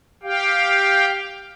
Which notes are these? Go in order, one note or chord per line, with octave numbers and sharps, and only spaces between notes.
G4 F5 G5